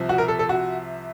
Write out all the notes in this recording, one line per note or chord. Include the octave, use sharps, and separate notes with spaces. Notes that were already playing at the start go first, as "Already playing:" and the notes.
Already playing: C2 C3 F3
F#4
A#4
A4
A4
F#4